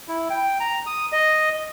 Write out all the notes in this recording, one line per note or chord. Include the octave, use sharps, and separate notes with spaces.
E4
G5
A#5
D#6
D#5